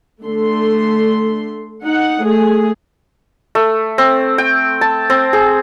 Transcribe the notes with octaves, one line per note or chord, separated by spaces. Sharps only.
D3 A3 C6
D#4 F#5
A3 G#4
A3
C4
G5
A5
C4
G#4